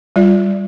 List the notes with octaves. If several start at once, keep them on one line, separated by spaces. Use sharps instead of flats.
G3 F4 D5